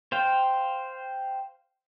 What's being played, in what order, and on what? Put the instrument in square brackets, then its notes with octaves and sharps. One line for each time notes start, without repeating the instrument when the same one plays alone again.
[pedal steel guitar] C5 F5 G5